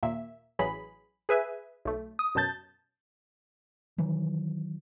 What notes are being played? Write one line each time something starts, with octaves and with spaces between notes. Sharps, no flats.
D#2 A#2 A#3 E5
A1 E3 F#3 G#4 B5
G#4 B4 E5 G#5
B1 A3
D#6
F#2 B2 F#3 A5 G6 A6
D#3 E3 F#3